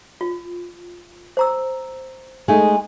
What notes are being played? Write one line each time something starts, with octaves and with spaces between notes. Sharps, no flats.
F4
C5 A#5 E6
G#3 A3 D#4 G#5